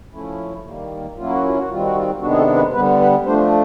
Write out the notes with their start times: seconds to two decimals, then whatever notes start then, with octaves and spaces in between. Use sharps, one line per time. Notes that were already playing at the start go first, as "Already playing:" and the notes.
0.12 F3 A3 C#4 E4
0.64 D#3 G3 A#3
1.17 F#3 A#3 C#4 E4 F4
1.30 F#4
1.44 F4
1.56 F#4
1.69 D#3 G3 C4 F4
1.83 F#4
1.96 F4
2.21 C3 D#3 G#3 B3 D4 F#4
2.31 G#4
2.38 A4
2.55 B4
2.73 D3 G3 B3 B4
3.00 B4
3.26 F3 A3 D4 C5